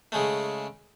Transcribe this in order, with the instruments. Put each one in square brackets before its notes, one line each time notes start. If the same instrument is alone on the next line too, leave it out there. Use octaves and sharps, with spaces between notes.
[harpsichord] C#3 G#3 A3